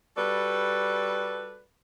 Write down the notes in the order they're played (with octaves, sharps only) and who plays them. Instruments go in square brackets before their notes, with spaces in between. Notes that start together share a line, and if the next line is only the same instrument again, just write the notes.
[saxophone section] G3 F#4 A4 B4 D5